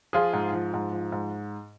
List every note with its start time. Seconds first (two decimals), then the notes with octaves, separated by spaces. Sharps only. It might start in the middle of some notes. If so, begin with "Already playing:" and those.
0.13 F3 F4 G#4
0.33 G#2
0.53 F3
0.74 G#2
0.92 F3
1.12 G#2